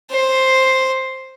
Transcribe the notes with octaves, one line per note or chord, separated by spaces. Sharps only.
C5